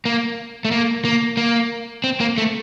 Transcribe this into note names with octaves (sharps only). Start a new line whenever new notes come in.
A#3
A3
A#3
A#3
A#3
C4
A#3
A3